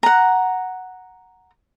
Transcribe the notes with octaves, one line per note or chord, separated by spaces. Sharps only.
F#5 A#5